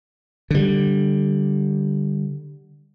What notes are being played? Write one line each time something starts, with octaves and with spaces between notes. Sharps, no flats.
D3 G3